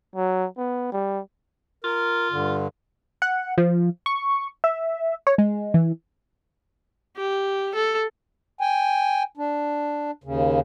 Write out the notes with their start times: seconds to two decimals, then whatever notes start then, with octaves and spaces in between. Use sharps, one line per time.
0.16 F#3
0.57 B3
0.92 G3
1.84 F4 A#4
2.32 G2 D3
3.22 F#5
3.58 F3
4.06 C#6
4.64 E5
5.27 C#5
5.38 G#3
5.74 E3
7.17 G4
7.75 A4
8.61 G5 G#5
9.37 D4
10.24 D#2 C#3